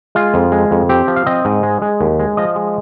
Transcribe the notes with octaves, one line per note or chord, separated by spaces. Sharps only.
G#3 F4
F2
G#3
F2
C4 G4
F3
F5
C4 D#5
G#2
G#3
G#3
D#2
G#3
F3 D#5
G#3